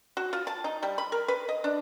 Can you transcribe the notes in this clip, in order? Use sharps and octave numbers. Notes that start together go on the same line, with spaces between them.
F#4
F4
A5
D#4
G3
B5
A#4
B4
D#5
D4